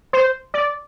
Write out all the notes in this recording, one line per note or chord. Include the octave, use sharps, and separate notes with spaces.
C5
D5